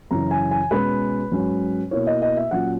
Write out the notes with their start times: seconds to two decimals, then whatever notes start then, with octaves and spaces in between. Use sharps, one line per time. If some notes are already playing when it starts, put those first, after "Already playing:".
0.11 F#2 C#3 E3 A#5
0.31 G#5
0.51 G#5
0.71 B2 G#3 C#4 B4
1.31 G#2 F#3 C#4
1.91 B2 A#3 E4 C#5
2.07 D#5
2.22 D#5
2.37 E5
2.51 A#2 F#3 C#4 F#5